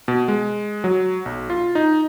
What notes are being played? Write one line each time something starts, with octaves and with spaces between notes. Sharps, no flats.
B2
G#3
F#3
B1
F4
D#4